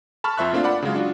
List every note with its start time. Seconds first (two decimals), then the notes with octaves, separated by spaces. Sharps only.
0.24 A5 B5 C#6 F6
0.37 F2 F3 C5 E5 C#6 F#6
0.53 A3 A#3 C4 D4 F4
0.64 D5 F#5 B5
0.82 C#3 F#3 G#3 F4
0.95 D4 F4 F#4